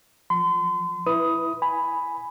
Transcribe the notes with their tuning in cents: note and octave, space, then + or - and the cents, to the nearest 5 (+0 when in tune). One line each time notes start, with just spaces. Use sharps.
F3 +10 C6 -40
E4 +0 B4 +0 D#6 +10
G#5 +0 B5 +5